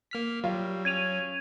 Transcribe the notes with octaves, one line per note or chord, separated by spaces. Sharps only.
A#3 F6 B6
F#3 G3 F4
C#4 G#6 D#7 F7